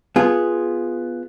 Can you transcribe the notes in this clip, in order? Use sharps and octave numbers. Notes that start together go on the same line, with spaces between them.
B3 F4 G#4